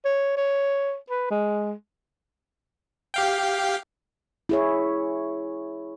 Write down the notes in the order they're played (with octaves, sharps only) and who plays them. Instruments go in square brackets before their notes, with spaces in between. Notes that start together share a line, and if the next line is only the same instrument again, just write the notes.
[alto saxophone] C#5
C#5
B4
G#3
[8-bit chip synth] G4 F5 G5
[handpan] E4 G#4 C#5